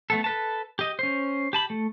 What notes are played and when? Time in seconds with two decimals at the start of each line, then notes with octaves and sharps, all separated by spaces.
0.10 A3 B3 A4
0.24 A4 B4 A5
0.79 G4 D#5
0.99 C#4 C5
1.53 G4 A5 B5
1.70 A3